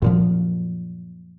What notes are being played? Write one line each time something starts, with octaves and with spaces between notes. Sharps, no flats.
F#2 A#2 F3